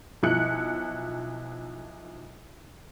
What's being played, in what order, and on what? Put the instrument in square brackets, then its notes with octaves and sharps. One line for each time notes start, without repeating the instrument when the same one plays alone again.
[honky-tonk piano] B1 F3 E4 F#6 C#7